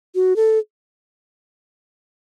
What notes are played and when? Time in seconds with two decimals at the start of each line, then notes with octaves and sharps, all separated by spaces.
0.15 F#4
0.36 A4